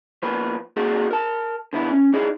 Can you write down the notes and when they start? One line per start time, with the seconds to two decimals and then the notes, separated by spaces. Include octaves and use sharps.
0.23 F3 A#3 B3 B4
0.76 A#3 C4 D#4 F#4 G#4 A4
1.11 A#4 A5
1.73 D3 B3 E4
1.91 C#4
2.13 D#4 E4 G#4 D5 D#5